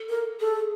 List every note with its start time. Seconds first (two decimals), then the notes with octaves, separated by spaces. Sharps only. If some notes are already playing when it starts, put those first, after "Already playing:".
Already playing: A4
0.09 A#4
0.39 G#4 A4